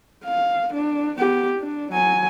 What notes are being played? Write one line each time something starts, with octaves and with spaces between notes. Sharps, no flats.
F5
D4
B3 G4
D4
F#3 G#5